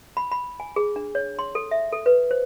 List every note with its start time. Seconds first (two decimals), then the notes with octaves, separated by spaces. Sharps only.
0.17 B5
0.32 B5
0.60 G#5
0.76 G#4
0.96 D4
1.15 C#5
1.39 C6
1.55 A4
1.71 E5
1.93 A4
2.06 B4
2.31 C5